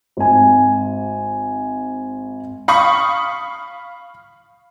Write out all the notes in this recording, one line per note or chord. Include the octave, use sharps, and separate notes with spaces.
G#1 G#5
F5 B5 C#6 D#6